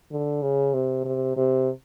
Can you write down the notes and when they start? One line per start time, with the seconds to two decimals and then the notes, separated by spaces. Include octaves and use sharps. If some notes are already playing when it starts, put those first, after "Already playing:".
0.12 D3
0.42 C#3
0.74 C3
1.05 C3
1.37 C3